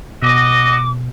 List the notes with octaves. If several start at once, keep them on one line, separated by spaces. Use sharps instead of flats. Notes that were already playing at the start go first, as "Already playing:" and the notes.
B2 F#4 D#5 D6